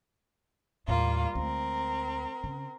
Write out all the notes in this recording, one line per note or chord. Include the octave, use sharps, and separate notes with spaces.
D#2 A2 G3 A#3 F4
D2 G#3 C4 A#4
C#3